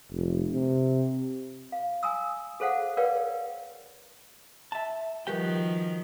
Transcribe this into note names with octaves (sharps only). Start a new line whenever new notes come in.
F1
C3
F5
G#5 A#5 D#6 E6
G#4 A4 C5 F5 F#5
A#4 B4 C#5 D5 F5 G5
E5 A5
D#3 F3 G3 F#4 G4 A#4 B4 G5